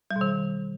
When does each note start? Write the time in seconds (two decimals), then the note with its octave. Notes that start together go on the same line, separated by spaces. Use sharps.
0.11 G3
0.16 B2
0.21 D#3